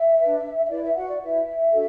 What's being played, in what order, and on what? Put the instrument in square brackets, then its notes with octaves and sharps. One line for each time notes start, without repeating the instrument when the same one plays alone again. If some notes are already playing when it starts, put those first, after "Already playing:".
Already playing: [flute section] E5
B4
D4
E5
E4 B4 D5
E5
F#4 F#5
D5
E4 B4 E5
D4 F#4 A4